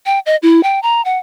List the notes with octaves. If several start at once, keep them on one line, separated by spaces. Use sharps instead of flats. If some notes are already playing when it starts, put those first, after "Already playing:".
G5
D#5
E4
G5
A#5
F#5